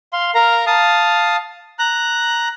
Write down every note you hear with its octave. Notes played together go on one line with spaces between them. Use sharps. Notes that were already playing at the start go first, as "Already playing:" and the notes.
F5 C6
A#4 F5 A#5
F5 A5 D#6
A#5 F#6